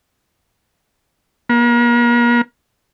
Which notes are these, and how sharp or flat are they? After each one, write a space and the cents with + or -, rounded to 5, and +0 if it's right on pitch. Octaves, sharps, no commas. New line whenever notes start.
A#3 +40